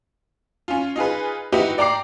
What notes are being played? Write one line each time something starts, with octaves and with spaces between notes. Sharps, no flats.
C#4 F4
D#4 F4 G#4 B4
D#4 E4 F#4 G4 B4
D5 G5 A#5 D6 C7